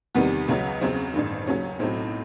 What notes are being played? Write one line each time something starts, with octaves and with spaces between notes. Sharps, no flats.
E2 C3 D#3 G3 B3
C#2 C#3 F#3
E2 C#3 F#3 C4
A1 G2 D#3
D#2 C#3 F#3 C#4
B1 A2 F#3 C4